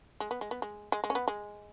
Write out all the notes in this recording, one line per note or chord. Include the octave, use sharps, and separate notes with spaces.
G#3
B3
G#3
B3
G#3
G#3
G#3
C#4
B3
G#3